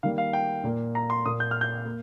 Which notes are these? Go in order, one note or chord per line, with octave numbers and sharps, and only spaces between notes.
D#3 G3 A#3 F5
F5
G5
A#2 A#3
A#5
C6
A#2 A#3 D#6
G6
F6
G6
A#3